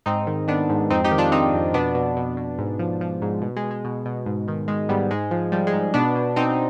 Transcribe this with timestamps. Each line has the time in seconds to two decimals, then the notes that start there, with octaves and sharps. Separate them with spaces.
0.06 G#2 C4 D#4
0.27 D#3
0.48 D#3 B3 D4
0.70 G#2
0.90 F2 C4 D#4
1.04 D#4 G4
1.11 D#3
1.18 D4 F4
1.32 D#3 C4 D#4
1.54 F2
1.74 B2 B3 D4
1.95 B2
2.17 B2
2.37 B2
2.58 G#2
2.79 F3
3.01 F3
3.22 G#2
3.42 B2
3.56 G#3
3.63 B2
3.71 G#3
3.85 B2
4.05 B2
4.26 G#2
4.48 D#3
4.68 D#3 G#3
4.89 G#2 G3 B3
5.11 G#2 G#3
5.31 F3
5.52 F3 G3
5.67 G#3
5.74 G#2
5.94 B2 B3 D4
6.16 B2
6.36 B2 C4 D#4